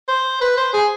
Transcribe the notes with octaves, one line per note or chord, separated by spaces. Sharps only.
C5
B4
C5
G#4